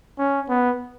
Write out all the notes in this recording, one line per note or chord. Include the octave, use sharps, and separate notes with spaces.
C#4
B3